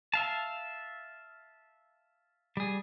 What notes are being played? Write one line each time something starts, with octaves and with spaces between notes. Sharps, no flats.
E5 F5 A5
G3 G#4